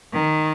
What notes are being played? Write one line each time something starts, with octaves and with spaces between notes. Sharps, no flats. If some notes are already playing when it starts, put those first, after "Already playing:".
D#3